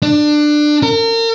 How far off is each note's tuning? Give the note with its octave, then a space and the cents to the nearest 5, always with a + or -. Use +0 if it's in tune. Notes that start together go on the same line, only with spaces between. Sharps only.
D4 +20
A#4 -35